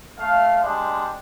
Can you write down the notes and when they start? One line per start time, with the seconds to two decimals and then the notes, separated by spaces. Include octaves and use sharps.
0.19 A3 F5
0.62 G3 G#3 D4 C5